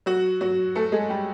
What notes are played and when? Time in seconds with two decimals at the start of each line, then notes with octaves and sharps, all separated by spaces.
0.06 F#3 F#4
0.41 F#3 F#4
0.75 A3 A4
0.92 G#3 G#4
1.09 G3 G4